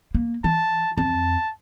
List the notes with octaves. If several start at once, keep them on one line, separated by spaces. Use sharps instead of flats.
A#3
E3 A5
F2 A5